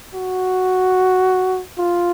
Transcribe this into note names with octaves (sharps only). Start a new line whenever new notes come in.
F#4
F4